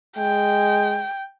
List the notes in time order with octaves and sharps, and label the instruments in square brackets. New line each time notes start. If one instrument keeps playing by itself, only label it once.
[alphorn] G#3 [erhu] G5